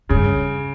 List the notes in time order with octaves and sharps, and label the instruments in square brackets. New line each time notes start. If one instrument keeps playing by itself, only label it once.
[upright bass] G2 [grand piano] C#3